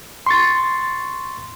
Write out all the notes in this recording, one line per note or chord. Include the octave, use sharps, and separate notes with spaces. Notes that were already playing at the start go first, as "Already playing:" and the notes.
C6 C#6 A6